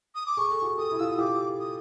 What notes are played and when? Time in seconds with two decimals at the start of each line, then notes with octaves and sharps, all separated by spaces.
0.15 D#6
0.26 D6
0.37 G#4 C#6
0.50 A4
0.62 F#4 G#4
0.78 G4 A4 D#6
0.91 E4
0.99 F4 E6
1.09 F#4 D#6
1.18 F4 G4 D6
1.59 D#6